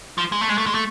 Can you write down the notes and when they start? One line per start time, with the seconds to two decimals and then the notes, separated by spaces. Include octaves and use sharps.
0.18 F3
0.32 G#3
0.41 A3
0.49 G#3
0.58 A3
0.66 G#3
0.74 A3